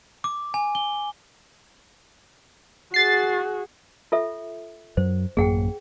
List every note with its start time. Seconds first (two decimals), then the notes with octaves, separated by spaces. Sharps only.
0.24 D6
0.54 G#5
0.75 G7
2.94 F#4 G#4 A6 C7
4.12 F4 A4 E5
4.97 F#2 F#3 C5
5.37 A1 F#2 A#3 G#4 F#5 G5